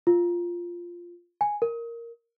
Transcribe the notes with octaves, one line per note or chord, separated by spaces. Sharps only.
F4
G#5
A#4